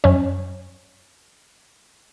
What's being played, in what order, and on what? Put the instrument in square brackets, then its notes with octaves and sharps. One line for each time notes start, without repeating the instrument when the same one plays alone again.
[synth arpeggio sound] F#2 C#4